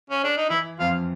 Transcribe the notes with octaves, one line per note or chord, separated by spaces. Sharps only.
C#4
D4
D#4
E3 E4
F2 F3 F4